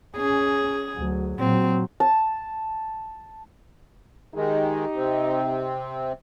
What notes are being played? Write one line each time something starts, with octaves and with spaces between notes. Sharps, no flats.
C#4 G#4
D2 F#3
A#2 F#3 C4
A5
D#3 G#3 D#4 G4 D#5
C3 C4